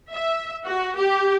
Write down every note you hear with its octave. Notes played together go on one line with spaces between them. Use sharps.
E5
F#4
G4